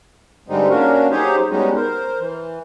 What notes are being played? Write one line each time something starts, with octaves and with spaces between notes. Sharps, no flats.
G2 D3 G3 G#3 C4 D#4
A#3 C#4 D4 F#4 A#4
F#3 D#4 G4 G#4 C5 C#5
G3 G#3 B3 C#4 D#4 F#4
A#4 C5
E3